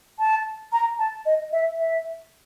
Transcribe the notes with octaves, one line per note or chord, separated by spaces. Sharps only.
A5
A#5
A5
D#5
E5
E5